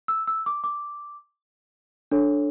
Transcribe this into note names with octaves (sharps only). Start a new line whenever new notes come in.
E6
E6
D6
D6
D4 A4 C#5